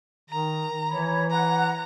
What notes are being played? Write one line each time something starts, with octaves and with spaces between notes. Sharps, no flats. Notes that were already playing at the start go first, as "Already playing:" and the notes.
D#3 A#5
E3 C#5 B5
F#5 A#5 F#6